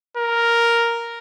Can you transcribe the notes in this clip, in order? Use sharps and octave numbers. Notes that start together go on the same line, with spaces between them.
A#4